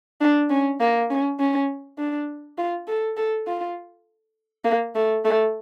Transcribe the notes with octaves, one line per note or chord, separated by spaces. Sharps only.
D4
C#4
A#3
C#4
C#4
D4
F4
A4
A4
F4
A#3
A3
A3